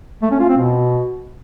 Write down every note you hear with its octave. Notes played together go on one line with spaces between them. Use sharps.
A3
C#4
F4
C4
B2